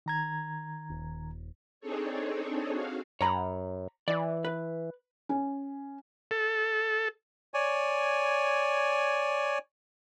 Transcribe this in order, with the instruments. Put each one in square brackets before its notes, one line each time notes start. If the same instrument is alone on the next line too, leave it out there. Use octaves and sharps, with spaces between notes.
[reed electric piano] D#3 A#5 G#6
[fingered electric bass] D#1
[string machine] C4 D4 D#4 G#4 A4 C#5
F#4 F5
[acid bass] F#2 [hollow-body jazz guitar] C#5 A#5 B5
[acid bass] E3 [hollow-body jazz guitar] D5
[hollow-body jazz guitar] B4
[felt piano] C#4
[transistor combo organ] A4
[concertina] C#5 D5 G#5